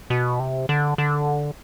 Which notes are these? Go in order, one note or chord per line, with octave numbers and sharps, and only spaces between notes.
B2
C3
D3
D3